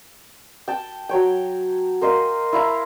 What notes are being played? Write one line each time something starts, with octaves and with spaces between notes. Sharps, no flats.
G5 A5
F#3 C#5 G5
A#4 C5 D#5 F5
E4 F5 A#5